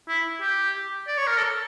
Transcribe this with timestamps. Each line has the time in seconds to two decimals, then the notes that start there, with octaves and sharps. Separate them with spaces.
0.08 E4
0.41 G4
1.07 D5
1.18 C#5
1.27 A#4
1.37 A4